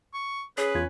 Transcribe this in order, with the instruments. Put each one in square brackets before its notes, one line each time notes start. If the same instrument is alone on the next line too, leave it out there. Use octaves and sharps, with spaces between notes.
[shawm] C#6
[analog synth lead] C#4 [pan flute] G#4 [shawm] B4
[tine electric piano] E2 F4 G#6